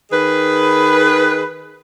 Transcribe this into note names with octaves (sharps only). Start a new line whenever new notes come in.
D#3 G#4 B4